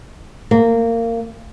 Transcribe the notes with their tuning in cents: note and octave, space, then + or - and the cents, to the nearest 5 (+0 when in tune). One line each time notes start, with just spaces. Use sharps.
A#3 -20